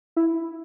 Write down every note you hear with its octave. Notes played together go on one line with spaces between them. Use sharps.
E4